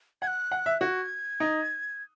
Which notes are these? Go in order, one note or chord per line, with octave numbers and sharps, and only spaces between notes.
F#5 G#6
F#6
F#5
E5
F#4 G#6
D#4